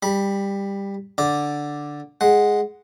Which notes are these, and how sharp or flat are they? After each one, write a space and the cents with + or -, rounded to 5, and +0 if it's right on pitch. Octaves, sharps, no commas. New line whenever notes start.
G3 +15 B5 -20
D3 +0 D5 +0
G#3 +0 F#5 -5